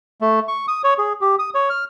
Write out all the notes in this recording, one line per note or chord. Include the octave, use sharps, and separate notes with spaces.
A3
C#6
D#6
C#5
G#4
G4
D#6
C#5
F6